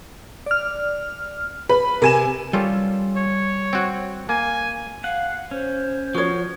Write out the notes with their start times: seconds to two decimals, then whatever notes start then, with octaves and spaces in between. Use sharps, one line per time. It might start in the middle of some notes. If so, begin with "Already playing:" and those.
0.46 D5 F6
1.69 B4 B5
2.02 C3 A#4 G#5 E7
2.53 G3 C#4 F4 A4
3.16 C#5
3.73 C4 F#4
4.29 A#3 G#5
5.04 F5 F#5
5.51 C#4 C5
6.15 F3 F#4 C#5